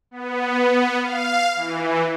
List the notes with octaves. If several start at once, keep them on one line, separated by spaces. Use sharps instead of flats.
B3
F5
E3